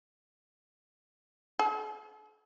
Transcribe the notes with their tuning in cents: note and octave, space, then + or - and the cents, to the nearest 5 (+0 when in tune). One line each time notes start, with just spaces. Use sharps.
A4 -45